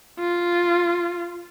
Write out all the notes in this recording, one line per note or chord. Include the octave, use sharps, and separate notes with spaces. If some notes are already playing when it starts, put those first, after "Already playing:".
F4